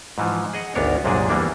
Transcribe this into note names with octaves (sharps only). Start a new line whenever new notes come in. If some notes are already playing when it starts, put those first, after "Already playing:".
G#2 E3 F3
G#4 D#5 F#5
G#1 D2 B3 D4 A#4 C#5
C2 F#2 A#2 G#3 D4 G#4
E2 E3 G3 A#3 D4